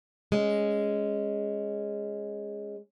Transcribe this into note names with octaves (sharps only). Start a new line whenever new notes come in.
G#3 C#4